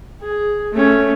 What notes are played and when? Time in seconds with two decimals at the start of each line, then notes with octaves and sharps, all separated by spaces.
0.21 G#4
0.72 A3 C#4